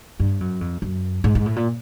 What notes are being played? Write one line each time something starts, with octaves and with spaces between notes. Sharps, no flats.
G2
F#2
F2
F#2
G#2
G#2
A2
A#2